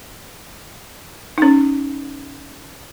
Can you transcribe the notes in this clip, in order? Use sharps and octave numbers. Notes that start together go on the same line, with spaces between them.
C#4 D#4